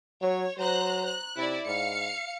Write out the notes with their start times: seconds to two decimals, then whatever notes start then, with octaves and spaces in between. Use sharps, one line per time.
0.22 F#3 C#5
0.58 F#3 C5 A#5 F#6
1.06 F#6
1.36 C3 E4 D5
1.66 G#2 F5 C#7